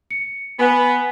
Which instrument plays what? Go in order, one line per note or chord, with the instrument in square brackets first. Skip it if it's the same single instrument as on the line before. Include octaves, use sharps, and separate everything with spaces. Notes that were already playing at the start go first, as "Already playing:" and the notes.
[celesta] C#7
[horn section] B3 [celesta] G#5